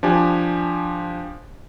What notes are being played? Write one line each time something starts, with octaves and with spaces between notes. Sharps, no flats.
F3 D4 G4 G#5